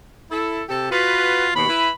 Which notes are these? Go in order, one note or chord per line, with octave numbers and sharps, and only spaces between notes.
E4 A4
C3 G4 A4
F4 F#4 B4
D#2 B2 B5
E4 B4